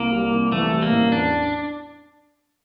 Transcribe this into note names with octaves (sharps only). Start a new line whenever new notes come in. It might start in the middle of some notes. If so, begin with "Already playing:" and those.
Already playing: C2 A#3
G3
C2
E3 A3
G3
A#3
A1
E2 D4